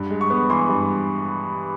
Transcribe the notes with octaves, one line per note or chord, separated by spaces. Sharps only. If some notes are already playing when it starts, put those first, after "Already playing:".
Already playing: G2
G#3
C#6
B3
E3 C6
G2